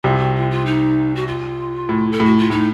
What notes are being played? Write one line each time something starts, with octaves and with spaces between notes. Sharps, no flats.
C2 C3 F4
F#4
F4
F4
D#4
F#4
F4
A2
A4
A2 F#4
F4
A2 D#4